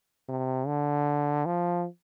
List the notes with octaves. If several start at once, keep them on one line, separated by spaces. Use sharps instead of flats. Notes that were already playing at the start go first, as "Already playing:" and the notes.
C3
D3
F3